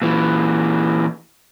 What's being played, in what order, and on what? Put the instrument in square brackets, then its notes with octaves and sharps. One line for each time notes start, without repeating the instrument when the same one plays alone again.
[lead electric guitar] A#2 E3